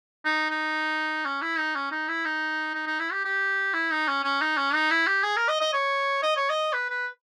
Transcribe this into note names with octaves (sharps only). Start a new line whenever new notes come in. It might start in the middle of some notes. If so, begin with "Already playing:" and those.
D#4
D#4
C#4
E4
D#4
C#4
D#4
E4
D#4
D#4
D#4
E4
G4
G4
E4
D#4
C#4
C#4
D#4
C#4
D#4
E4
G4
G#4
A#4
D#5
D#5
C#5
D#5
C#5
D#5
B4
B4